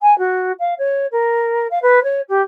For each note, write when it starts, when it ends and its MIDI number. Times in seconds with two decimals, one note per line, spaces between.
0.02 0.16 80
0.18 0.52 66
0.59 0.74 77
0.78 1.06 73
1.11 1.67 70
1.70 1.78 77
1.82 2.02 71
2.03 2.20 73
2.28 2.41 67